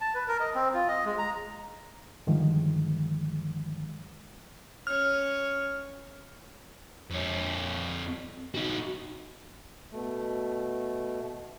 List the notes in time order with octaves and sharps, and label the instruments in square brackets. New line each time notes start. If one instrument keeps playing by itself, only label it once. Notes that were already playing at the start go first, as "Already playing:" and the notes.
[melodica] A5
B4
A#4
D#5
C4
F4
D#5
G#3
A#5
[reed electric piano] G2 D3 D#3 F3 G#3
[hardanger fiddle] C#4 C#5 [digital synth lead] F6
[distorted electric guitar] F2 C#5
D#4 F#4
[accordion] B2 A3